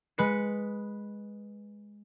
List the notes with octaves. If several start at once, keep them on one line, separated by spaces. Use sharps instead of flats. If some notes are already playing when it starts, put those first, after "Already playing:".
G#3 B4 C#7